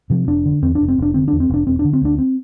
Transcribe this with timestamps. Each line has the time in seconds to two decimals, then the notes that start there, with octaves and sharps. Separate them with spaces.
0.10 C3 F3
0.28 F1 D4
0.45 D3
0.62 E2 C4
0.75 D4
0.81 F1
0.88 C4
0.98 F1 D4
1.14 D3 C4
1.28 E2 D4
1.40 C4
1.50 F1 D4
1.67 E1 C4
1.79 D4
1.85 D3
1.93 C4
2.02 D2 D4
2.18 C4